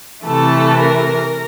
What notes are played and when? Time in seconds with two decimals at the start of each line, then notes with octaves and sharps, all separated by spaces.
0.24 C3 E3 A3 A4
0.79 A#4